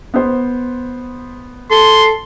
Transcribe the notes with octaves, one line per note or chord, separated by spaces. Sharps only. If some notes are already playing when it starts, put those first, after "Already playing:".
B3 C5
A4 C6